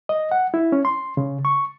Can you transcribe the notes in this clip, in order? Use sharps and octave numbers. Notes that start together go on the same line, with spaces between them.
D#5
F#5
E4
C#4
C6
C#3
C#6